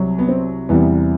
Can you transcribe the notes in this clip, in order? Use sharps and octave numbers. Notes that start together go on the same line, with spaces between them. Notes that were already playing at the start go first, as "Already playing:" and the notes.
Already playing: C2 C3 F#3
B3
C4
E2 C3 E3 G3 B3